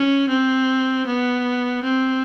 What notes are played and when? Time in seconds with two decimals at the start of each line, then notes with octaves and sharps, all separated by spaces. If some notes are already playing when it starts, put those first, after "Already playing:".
Already playing: C#4
0.29 C4
1.07 B3
1.84 C4